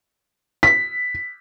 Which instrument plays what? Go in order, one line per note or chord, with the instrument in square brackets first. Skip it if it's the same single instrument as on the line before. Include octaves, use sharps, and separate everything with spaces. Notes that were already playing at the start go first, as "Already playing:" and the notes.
[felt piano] B6